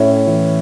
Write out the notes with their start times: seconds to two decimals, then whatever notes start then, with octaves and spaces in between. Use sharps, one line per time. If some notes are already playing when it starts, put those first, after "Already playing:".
Already playing: A2 C#4 E4
0.27 E3